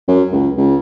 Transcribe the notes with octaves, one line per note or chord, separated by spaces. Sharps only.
F#2
C#2
C#2